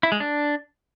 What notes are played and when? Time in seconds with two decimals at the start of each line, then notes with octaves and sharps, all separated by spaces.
0.03 E4
0.12 G#3
0.20 D4